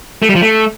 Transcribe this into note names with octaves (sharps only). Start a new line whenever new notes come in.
A3
G3
F3
A3